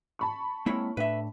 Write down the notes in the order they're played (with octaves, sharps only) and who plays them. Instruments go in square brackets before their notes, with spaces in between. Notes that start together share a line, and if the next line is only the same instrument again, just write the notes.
[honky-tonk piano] A5 B5 C#6
[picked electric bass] G#3 C4 [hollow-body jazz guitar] A#3 E4 C#5
[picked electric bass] A2 A3 D4 [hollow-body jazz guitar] B4 E5